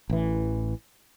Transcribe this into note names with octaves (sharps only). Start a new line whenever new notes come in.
A1 E3